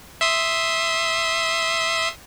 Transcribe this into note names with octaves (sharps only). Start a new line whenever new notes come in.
E5 C6 D#6